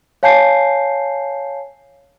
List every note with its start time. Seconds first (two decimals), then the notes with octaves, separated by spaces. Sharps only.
0.23 C#5 F5 G#5 A5 G6 C7